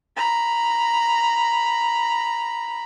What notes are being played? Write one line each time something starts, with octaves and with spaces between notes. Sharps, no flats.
A#5 B5